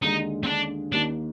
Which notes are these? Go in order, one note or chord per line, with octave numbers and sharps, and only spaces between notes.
D#2 D3 G#3 D#4
C4
D4
D#2 D#3 A#3 D4